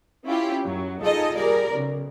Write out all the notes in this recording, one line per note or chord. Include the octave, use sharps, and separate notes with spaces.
C#4 E4 F4 G4
F#2 F#3
D#4 F4 G#4 A4 D#5
G3 G#4 A#4 D5
B1 C#3